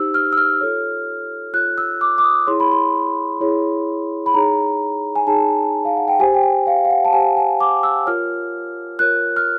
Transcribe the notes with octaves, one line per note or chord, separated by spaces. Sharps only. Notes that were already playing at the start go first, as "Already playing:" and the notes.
Already playing: D#4 G4 C5 E6
F6
E6
F6
F4 A4 C#5
F4 A4 C#5 F#6
E6
D6
D6
D#6
E4 G#4 C#5 C6
B5
C6
E4 G#4 C#5
B5
D#4 G#4 C#5 A#5
G#5
D#4 G#4 C#5 A5
F5
F#5
G5
G4 C5 G#5
G5
G#5
F5
F5
F#5
A5
G4 C5 G#5
G#5
D6
E6
F4 A#4 C#5 F6
F4 A#4 C#5 F#6
F6